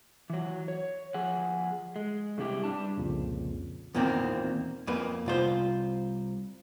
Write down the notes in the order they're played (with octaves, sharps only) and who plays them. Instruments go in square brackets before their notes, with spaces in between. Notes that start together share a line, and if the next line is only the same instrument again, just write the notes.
[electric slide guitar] E3 F#3
C#5
F3 G#4 F#5
G#3
G2 C3 G3 E4 G4
G2 G3 D4 A5
[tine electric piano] C2 F2 A#2 C#3
[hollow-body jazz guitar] E2 A#2 D#3 A#3 C4
F2 A#3 B4
C2 F4 C5